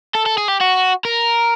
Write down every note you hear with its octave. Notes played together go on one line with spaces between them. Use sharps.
A4
A4
G#4
G4
F#4
A#4